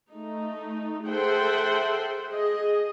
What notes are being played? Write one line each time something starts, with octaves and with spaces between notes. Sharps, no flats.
A3 D#4
G#4 A4 C5 E5 F#5 G5
G#4 D#5